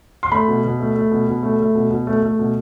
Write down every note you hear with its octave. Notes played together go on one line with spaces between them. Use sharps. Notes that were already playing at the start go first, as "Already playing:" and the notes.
C6
A3 B5
B2
B2
A3
A3
B2
B2
A3
A3
B2
B2
A3
A3
B2